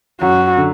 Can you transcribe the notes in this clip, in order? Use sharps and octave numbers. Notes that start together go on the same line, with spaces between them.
F#2 F#4
D3